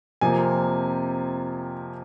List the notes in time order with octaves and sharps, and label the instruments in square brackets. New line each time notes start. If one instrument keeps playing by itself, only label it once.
[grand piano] F2 C3 F3 A#3 G#5